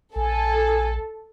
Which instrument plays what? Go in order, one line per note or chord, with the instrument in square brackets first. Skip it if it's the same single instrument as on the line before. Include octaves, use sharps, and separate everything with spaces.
[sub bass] A#1 [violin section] A4 [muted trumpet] G#5